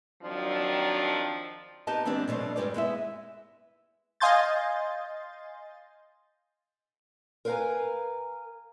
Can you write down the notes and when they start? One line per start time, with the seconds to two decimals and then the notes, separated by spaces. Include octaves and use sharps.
0.23 D#3 F3 F#3 C4 D4
1.87 B3 D#4 G4 D#5 A5
2.05 E3 G#3 B3 C4 D4 G4
2.28 B2 F#3 A3 D4 C5
2.56 G2 E3 G#3 G4 B4 D5
2.74 G#3 B3 E4 E5
4.20 D#5 F5 G#5 C6 G6 A6
7.45 A#4 B4 F5 G5 G#5 A#5